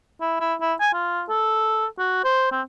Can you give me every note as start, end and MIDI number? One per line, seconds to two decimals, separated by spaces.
0.21 0.36 64
0.40 0.54 64
0.61 0.74 64
0.80 0.90 80
0.93 1.23 65
1.29 1.86 69
1.98 2.20 66
2.24 2.48 72
2.52 2.61 60